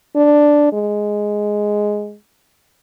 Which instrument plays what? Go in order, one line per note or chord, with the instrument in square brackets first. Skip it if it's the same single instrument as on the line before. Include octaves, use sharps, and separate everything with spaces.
[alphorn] D4
G#3